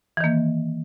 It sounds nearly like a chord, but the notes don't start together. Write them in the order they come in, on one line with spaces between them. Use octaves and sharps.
E3 D#3 A#3